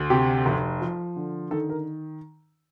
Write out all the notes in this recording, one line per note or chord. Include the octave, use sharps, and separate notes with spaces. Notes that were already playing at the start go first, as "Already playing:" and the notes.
Already playing: D2
C3 G4
F1
F3
D3
D#3 A4
A#4